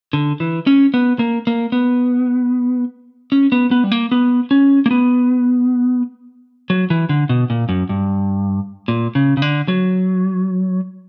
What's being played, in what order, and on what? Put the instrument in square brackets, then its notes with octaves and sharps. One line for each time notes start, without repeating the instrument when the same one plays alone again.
[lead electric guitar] D3
E3
C#4
B3
A#3
A#3
B3
C#4
B3
B3
G3
A#3
B3
C#4
A#3
B3
F#3
E3
D3
B2
A#2
F#2
G2
A#2
C#3
C#3
D3
F#3